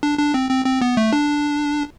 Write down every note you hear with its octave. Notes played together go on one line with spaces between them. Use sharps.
D4
D4
C4
C4
C4
B3
A3
D4